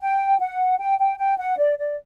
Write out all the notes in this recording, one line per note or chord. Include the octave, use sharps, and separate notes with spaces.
G5
F#5
G5
G5
G5
F#5
D5
D5